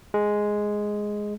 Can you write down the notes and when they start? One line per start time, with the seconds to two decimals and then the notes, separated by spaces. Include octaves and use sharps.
0.14 G#3